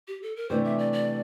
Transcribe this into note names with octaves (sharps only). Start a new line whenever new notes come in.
G4
A4
A#4
C3 E3 A3 D4 G4 C5
E5
D5
D5